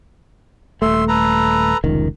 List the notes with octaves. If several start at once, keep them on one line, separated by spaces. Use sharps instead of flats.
D#1 A3 E5 C6
A4 B4 A#5
F1 C#2 D#3